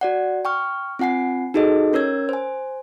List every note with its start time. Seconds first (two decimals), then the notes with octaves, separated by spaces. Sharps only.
0.01 F#4 D5 F#5
0.45 G5 C#6 F6
0.99 C4 F4 F#5 G#5 C7
1.54 D#4 F#4 G#4 A4 D#5
1.93 C#4 A#4 C#5 E6 G#6
2.29 C5 G#5